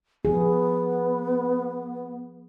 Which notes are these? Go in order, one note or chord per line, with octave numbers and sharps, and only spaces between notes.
F3 B3 G#4